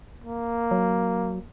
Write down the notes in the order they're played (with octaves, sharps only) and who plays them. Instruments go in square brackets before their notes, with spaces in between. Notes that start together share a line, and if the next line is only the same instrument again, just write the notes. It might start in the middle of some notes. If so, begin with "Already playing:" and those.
[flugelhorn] A#3
[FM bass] F#3